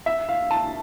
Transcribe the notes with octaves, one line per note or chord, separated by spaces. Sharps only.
E5
F5
A5